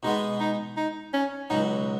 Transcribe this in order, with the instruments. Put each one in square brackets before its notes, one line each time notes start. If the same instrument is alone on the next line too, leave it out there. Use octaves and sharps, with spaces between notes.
[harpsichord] B2 G#3 B3 [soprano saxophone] D#4
[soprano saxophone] D#4
D#4
C#4
[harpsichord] C#2 B2 F#3 [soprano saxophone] D#4